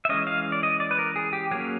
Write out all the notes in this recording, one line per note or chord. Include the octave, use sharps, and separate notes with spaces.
E5
E3 G#3 C#4 D#5
F5
D5
D#5
D5
B4
A#4
G#4
G4
F#3 A#3 C#4 G#4